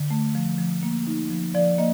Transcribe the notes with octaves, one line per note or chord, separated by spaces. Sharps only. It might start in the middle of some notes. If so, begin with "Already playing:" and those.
Already playing: D3
A3
F3
F3
A#3
D#4
F3
F3 D5
A#3 D#5